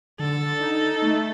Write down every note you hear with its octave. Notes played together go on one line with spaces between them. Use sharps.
D3 A4
D3
D#4
D#4
A3